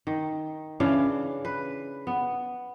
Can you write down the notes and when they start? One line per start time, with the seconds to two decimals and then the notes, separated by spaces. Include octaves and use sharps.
0.07 D#3
0.80 C#3 E3 D4 F5
1.45 B4
2.07 B3